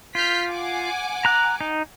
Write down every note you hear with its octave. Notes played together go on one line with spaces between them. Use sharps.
F4 F6 G6 B6
F#5 G#5 D6
A#5 F#6
D#4